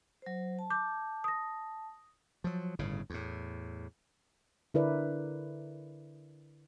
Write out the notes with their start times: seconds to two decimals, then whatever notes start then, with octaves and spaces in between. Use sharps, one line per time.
0.22 F#3 C5
0.59 A5
0.70 A5 D6 G6
1.24 D#6 A#6
2.44 F3 F#3
2.79 G1 A2 C#3
3.10 E2 A2
4.74 D3 E4 A#4 B4 D5